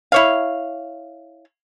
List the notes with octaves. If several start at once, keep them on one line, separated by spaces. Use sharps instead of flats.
E4 C#5 F5